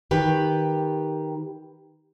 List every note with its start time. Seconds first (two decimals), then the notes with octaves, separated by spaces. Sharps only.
0.11 D#3 G4 B4